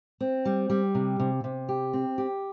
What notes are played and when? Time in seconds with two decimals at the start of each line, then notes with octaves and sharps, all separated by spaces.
0.21 C4
0.45 G3
0.70 G3
0.95 C3
1.20 C3
1.44 C3
1.69 G4
1.93 C4
2.18 G4